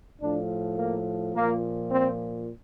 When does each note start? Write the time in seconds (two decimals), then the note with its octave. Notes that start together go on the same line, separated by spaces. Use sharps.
0.20 A2 F3 D4
0.78 A#3
1.35 A#2 F3 A#3
1.91 C4